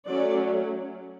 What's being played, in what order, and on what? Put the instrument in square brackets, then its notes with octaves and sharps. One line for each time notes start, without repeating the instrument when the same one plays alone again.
[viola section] F#3 A3 C#4 D5